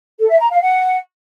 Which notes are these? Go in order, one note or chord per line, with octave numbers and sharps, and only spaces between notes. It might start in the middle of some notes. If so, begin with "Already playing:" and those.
A4
E5
A#5
F5
F#5